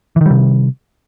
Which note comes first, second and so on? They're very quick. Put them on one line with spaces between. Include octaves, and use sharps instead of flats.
E3 D#3 G3 C3